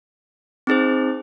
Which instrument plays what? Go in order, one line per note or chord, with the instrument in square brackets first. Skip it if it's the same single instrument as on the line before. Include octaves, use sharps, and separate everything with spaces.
[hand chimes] C4 D#4 G#4 C5